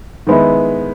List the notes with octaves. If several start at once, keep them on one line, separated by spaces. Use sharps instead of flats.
D#3 G#3 B3 E4